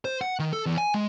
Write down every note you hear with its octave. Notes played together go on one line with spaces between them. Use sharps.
C5
F#5
D#3
A4
E2
G#5
G#3